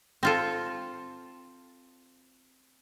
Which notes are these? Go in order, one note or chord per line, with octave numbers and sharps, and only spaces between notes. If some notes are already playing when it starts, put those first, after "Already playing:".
C4 F4 A4